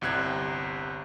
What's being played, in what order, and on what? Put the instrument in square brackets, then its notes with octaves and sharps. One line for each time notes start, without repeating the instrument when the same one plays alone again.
[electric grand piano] G1 C2 C3 F#6 G#6